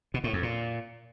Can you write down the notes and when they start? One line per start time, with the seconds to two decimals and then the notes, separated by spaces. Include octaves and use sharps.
0.14 B2
0.24 A2
0.33 F2
0.43 A#2